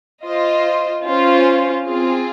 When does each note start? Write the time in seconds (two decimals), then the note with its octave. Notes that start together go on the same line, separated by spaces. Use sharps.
0.23 F4 C5 D#5
1.04 C#4 F4 C5
1.84 C4 F4 G#4